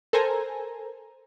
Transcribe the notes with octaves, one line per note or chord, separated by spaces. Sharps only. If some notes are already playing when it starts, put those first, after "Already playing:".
A4 A#4 C5 G#5 A#5